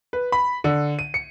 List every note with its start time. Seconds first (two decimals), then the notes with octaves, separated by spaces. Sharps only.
0.13 B4
0.32 B5
0.64 D3
0.99 D#7
1.14 C#7